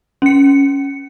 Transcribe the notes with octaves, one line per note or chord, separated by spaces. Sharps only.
C#4 C#7